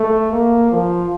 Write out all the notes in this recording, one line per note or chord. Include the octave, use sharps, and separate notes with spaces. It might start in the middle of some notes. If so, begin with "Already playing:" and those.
Already playing: A3
A#3
F3